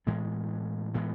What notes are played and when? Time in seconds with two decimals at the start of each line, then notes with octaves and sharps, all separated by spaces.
0.07 A2 E3 G#3 B3
0.94 A2 E3 G#3 B3